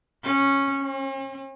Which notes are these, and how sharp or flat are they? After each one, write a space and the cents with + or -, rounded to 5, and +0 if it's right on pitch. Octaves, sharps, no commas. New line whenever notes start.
C#4 -10
C#4 -45